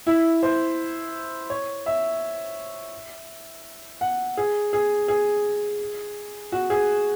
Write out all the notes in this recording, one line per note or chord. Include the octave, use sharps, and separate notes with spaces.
E4
C5
C#5
E5
F#5
G#4
G#4
G#4
F#4
G#4